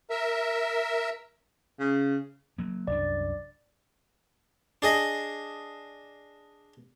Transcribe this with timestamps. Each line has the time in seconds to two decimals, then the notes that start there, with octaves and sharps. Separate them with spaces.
0.10 A#4 E5
1.79 C#3
2.58 F#3 A#3
2.87 C2 F#2 D4 D5
4.82 D4 G#4 D#5